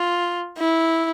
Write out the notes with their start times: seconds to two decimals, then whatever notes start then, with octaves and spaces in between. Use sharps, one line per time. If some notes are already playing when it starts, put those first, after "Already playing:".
Already playing: F4
0.58 E4